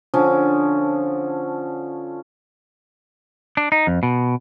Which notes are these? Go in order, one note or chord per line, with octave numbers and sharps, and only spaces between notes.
D3 F3 C#4
D4
D#4
F2
B2